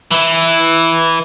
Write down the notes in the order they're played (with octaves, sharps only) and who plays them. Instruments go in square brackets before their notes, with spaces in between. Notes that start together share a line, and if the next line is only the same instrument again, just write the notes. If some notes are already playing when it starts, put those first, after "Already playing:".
[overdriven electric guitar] E3 E4